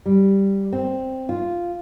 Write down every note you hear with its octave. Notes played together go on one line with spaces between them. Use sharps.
G3
C4
F4